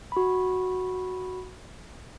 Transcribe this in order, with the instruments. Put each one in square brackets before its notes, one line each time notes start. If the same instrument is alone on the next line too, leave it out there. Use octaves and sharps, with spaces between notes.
[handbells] F#4 B5